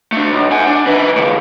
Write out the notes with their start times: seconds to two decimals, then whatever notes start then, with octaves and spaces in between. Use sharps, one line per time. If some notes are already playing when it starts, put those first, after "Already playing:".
0.12 A3 D4
0.32 B1
0.52 F#5 G#5
0.67 D4
0.87 D#3 B4
1.15 A2 C#3